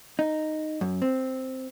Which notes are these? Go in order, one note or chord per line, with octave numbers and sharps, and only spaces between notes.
D#4
F#2
C4